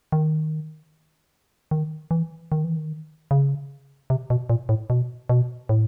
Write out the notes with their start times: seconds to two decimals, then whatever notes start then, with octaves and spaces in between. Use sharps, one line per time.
0.12 D#3
1.71 D#3
2.11 E3
2.52 D#3
2.64 E3
2.77 D#3
3.31 C#3
4.10 C3
4.30 B2
4.50 A#2
4.69 A2
4.90 B2
5.29 B2
5.69 A2